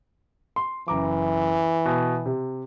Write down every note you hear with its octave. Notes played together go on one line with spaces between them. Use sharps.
C6
F#1 E3 A#5 D6
B2
C3